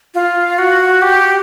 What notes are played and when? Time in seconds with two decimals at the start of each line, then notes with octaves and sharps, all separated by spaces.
0.15 F4
0.58 F#4
1.02 G4